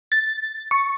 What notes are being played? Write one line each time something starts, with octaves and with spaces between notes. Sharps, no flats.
A6
C#6